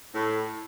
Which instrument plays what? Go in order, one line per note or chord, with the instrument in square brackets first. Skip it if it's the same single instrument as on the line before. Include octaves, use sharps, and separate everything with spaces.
[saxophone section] A2